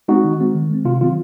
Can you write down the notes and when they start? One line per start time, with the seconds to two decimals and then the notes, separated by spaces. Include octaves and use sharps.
0.08 G#3 C4 D#4 F#4
0.24 D#3
0.39 G#3 C4
0.55 D#3
0.70 G#3 C4
0.85 C3 F4
1.00 D#3 F#3 C4 F4